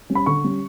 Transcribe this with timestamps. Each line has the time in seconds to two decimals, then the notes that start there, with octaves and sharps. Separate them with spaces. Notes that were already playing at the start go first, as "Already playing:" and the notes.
0.10 G3 C#4
0.15 B5
0.26 D3 C#6
0.44 G3 C#4